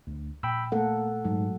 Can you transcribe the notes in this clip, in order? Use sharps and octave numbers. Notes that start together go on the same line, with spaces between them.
D2
A#2 G5 B5 E6
A3 A#3 A4 F#5
G#2 F#3 G#3